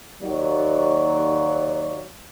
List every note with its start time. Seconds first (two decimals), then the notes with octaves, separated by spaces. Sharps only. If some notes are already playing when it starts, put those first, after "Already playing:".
0.22 D#2 F#3 D5